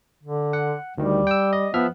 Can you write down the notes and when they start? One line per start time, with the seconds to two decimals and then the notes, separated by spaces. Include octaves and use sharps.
0.23 D3
0.53 F#5
0.98 D2 D#3 G3
1.27 G5 E6
1.53 D#5
1.74 F3 B3 E5 F6